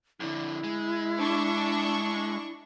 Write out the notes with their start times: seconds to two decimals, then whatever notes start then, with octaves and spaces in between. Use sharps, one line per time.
0.20 F2 D3 E4
0.64 G#3
1.17 D4 C#6